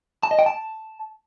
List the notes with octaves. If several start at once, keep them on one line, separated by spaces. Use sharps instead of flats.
A5
D#5
G5
A5